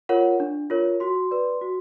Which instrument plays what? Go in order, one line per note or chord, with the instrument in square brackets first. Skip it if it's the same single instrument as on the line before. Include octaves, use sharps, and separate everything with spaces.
[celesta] F4 A#4 C#5 F#5
D4
F4 A#4 C#5
F#4 C6
B4 D5
F#4